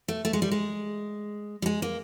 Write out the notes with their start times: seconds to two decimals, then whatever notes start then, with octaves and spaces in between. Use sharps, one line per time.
0.08 A3
0.25 A3
0.33 G#3
0.42 G3
0.51 G#3
1.62 G3
1.66 G#3
1.82 A#3